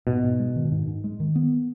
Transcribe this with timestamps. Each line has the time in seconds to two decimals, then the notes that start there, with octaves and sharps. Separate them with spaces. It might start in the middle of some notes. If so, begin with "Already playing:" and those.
0.07 G#2 B2
0.23 G#2
0.39 G#3
0.56 D#3
0.72 G#2
0.87 G#2
1.04 G#3
1.20 D#3
1.35 B3